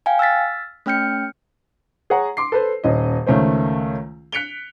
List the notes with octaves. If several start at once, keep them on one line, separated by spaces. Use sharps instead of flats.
F5 G5 G#5
E6 F6 A6 B6
A3 C#4 G5 F6 G6 C#7
G#4 C#5 F#5 A#5
C6 D6 C7
A4 B4 C5
D#1 C#4 D#5
C#2 D#3 A3 C#4 C5
F#6 B6 C#7 D7 F7 G7